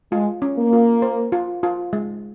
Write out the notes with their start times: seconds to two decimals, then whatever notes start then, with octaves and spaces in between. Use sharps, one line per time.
0.12 G#3 F4
0.42 C#4
0.57 A#3
0.73 F4
1.02 C5
1.32 F4
1.63 F4
1.93 G#3